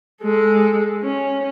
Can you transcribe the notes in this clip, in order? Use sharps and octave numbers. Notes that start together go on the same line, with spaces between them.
G#3 A4
C#4